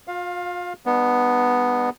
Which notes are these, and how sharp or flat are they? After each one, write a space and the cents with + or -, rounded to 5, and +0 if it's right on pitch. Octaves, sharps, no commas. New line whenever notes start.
F4 +35 F5 +15
G3 +45 B3 +0 D4 +45